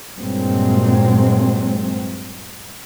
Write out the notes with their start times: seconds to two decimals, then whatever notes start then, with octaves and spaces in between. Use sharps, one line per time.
0.19 G2 A#2 F#3 G#3 C4